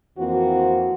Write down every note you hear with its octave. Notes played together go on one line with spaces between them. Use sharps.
F2 E3 A#3 C4 F#4